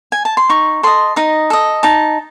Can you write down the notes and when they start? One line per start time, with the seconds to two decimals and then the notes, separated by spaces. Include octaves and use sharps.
0.12 G#5
0.25 A5
0.37 C6
0.49 D#4 C#6
0.83 A4 D#5 C6
1.16 D#4 D#5
1.50 A4 D#5
1.83 D#4 A5